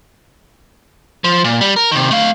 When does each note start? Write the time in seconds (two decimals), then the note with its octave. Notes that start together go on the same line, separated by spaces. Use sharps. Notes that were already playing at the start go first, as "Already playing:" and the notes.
1.24 F3
1.44 A#2
1.61 G3
1.76 A#4
1.91 C3 D#3
2.11 A3 F5